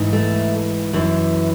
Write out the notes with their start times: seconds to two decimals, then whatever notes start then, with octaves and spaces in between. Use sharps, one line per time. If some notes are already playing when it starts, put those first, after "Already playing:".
Already playing: G#2 E3
0.13 A3
0.93 F#2 E3